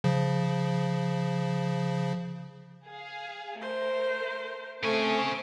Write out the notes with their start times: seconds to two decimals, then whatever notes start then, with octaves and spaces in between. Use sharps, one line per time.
0.04 C#3 F3
2.88 G#4 F5
3.61 A3 A#4 C5
4.83 C#3 A3 C4 C5 G#5 C#6 D6